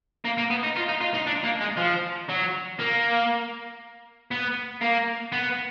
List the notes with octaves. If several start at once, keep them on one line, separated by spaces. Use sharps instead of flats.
A#3
A#3
B3
D#4
F4
D#4
F4
D#4
D4
A#3
G#3
F3
F#3
A#3
B3
A#3
B3